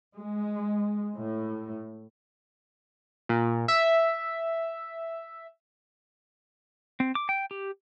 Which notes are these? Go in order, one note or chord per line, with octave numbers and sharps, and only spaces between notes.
G#3
A2
A#2
E5
C4
D6
G5
G4